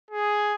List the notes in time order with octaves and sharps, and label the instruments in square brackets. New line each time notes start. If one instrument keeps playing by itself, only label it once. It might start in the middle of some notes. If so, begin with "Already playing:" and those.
[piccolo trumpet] G#4